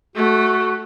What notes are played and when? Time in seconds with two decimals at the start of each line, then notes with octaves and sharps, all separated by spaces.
0.16 A3 F#4